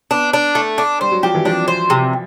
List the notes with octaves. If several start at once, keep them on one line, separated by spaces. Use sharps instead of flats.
B3 D4
D4
A3
D4
G3 C5
F#3
F3 G4
E3
F3 D4
C5
C3